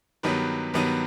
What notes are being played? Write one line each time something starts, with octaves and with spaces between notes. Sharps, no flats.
G2 D#3 F#3 B3 B4
G2 D#3 F#3 B3 B4